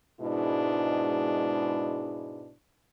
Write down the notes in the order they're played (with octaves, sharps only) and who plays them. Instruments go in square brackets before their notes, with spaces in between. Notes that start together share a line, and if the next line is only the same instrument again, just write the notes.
[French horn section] G#2 B2 G#3 D4 E4